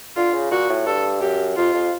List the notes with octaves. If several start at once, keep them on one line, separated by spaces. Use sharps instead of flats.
D3 F4
C#3
A#2 F#4
A2
G2 A4
F#2 G4
F2 F4
F2